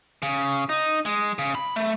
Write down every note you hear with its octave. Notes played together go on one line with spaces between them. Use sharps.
C#3
D#4
G#3
C#3
B5
A3